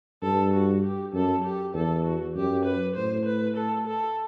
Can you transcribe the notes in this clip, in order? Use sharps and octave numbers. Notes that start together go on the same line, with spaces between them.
G2 A4
F#4
G4
F#2 A4
G4
E2 A4
F#4
F#2 G4
B4
A2 C5
B4
A4
A4